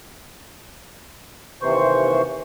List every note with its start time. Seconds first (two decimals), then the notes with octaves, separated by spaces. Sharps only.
1.62 D#2 C3 E3 C5 C#6